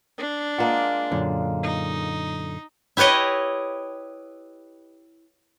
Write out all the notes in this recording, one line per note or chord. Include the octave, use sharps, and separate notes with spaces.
D4
G#3 A#3 F4 F#5
F#2 A#2 D3
D#4
E4 G4 B4 C#5 D#5